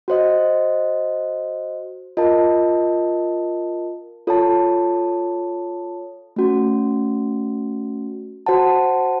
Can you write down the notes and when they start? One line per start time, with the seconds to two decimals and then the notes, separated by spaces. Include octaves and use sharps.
0.08 F#4 C5 D#5
2.17 F4 A#4 D#5 A5
4.27 F4 A4 C#5 A5
6.36 A3 C#4 F#4
8.46 F#4 C5 F#5 A5